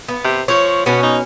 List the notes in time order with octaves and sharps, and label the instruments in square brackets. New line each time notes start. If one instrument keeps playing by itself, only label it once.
[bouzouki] B3
[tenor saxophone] C3
[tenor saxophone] F3 [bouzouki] C#5
[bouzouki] B2 C#4 [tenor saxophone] B3
[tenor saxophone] D#4